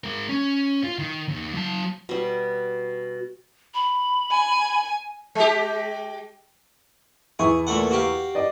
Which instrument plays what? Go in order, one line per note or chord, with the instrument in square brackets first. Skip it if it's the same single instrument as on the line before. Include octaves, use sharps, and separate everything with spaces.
[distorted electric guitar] G#3 A#4
C#4
F4
D#3
D#2
F#3 A5
[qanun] B2 G3
[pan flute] B5
[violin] G#5
[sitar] G#3 G4
[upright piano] E2 E4 C#6 [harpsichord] G#4
[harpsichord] A#2 A3 F#5
F#4 G4 F5
[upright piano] D5 D#5